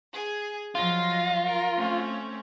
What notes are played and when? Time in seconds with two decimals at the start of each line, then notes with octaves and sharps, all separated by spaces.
0.13 G#4 G#5
0.75 F3 F#3 F4 D#5
1.46 A#4
1.76 A3 C4 C#4